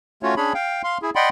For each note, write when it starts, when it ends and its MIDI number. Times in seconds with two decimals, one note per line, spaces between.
0.23 0.35 57
0.23 0.35 61
0.23 0.35 65
0.23 0.35 66
0.23 0.35 73
0.37 0.53 61
0.37 0.53 62
0.37 0.53 68
0.37 0.53 73
0.37 0.53 83
0.54 0.82 77
0.54 0.82 79
0.84 0.98 77
0.84 0.98 84
1.02 1.10 64
1.02 1.10 68
1.16 1.29 74
1.16 1.29 75
1.16 1.29 78
1.16 1.29 79
1.16 1.29 83
1.16 1.29 84